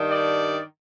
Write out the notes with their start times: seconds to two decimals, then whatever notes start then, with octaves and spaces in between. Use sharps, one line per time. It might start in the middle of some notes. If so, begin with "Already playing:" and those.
Already playing: G2 D#3 G3 D4
0.10 D5